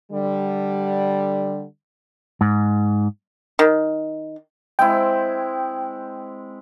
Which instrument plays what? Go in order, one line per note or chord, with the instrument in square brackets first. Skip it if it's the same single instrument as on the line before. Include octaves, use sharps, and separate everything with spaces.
[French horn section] D3 G3
[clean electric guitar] G#2
[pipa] D#3
[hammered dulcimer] G#3 C4 E4 [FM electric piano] G5